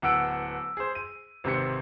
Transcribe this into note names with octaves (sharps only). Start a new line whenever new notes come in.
D1 B3 F#5 E6 D7
G#4 C5
D#7
G#1 C3 C4 B4 C#7